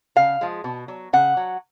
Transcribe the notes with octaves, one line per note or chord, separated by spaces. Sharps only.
C#3 F5
F3 G#3
B2
F#3
C#3 F#5
F#3